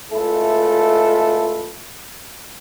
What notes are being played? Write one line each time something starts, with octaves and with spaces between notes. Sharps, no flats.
C#2 A3 E4 F4 A4